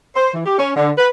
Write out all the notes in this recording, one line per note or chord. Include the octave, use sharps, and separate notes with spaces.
C5
E3
G4
C#4
D3
B4